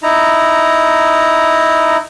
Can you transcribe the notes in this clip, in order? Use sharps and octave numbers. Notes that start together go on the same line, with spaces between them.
D#4 E4 A#5